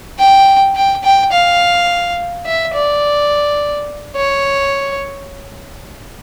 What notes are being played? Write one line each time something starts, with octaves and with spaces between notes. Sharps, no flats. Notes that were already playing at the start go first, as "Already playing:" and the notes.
G5
G5
G5
F5
E5
D5
C#5